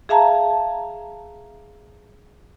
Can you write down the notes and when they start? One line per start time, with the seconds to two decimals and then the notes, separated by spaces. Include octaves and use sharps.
0.09 G#4 E5 F5 A5 A#5